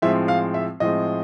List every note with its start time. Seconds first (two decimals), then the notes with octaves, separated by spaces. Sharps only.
0.02 A2 F3 G#3 C4 E5
0.28 F5
0.54 E5
0.80 A2 F3 G#3 C4 D#5